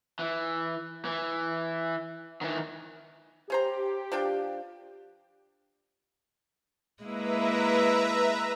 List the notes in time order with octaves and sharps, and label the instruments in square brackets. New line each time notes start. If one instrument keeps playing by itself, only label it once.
[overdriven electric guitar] E3
E3
D#3 E3
[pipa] C#4 C5 A#5 [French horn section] G4
[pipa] F3 D4 G5
[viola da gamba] G#3 A#3 E4 [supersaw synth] B4 E5 A#5